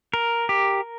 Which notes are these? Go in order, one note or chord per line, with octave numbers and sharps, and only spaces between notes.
A#4
G4